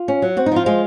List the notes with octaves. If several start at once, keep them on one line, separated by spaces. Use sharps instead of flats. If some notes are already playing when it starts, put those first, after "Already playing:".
Already playing: F4
C#4
F#3
C4 F#4
D#4
F3 F4
G#3 F4